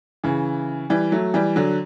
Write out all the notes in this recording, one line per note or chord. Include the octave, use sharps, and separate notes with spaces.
C#3 E3
E3 G3
F#3 A3
E3 G3
D3 F#3